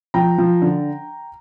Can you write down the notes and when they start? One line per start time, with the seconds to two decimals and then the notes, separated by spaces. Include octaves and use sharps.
0.14 F3 G5 A#5
0.38 F3
0.62 D3